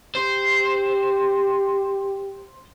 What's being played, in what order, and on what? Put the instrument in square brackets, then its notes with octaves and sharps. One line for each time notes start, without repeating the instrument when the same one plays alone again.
[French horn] G4 [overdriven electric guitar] C5